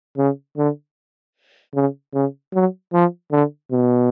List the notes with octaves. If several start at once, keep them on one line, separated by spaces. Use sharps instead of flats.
C#3
D3
C#3
C#3
F#3
F3
D3
B2